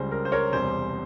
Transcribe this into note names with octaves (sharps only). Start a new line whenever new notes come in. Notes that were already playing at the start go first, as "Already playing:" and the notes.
Already playing: C#2 C#3 G3 C5
A#4
C5
A#4 C#5
E1 E2 C3 G3 C5